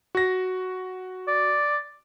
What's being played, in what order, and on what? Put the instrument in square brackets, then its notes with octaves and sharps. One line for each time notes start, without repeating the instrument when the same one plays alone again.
[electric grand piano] F#4 A#6
[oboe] D5